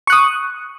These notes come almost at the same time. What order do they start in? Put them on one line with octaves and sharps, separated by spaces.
C#6 F#6 D#6